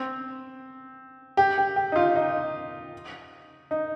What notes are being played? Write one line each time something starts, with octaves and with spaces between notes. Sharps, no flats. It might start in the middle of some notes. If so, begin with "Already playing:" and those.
Already playing: C4
G4
G4
G4
D#4
F4
D#4
D#4